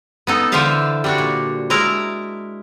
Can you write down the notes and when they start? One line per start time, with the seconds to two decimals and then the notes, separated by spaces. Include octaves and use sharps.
0.27 B3 D#4 A4
0.52 D3 E3 C5 E5 F5 A5
1.04 G3 D4 F#4
1.18 A#2
1.70 G#3 E4 A#4 A5 A#5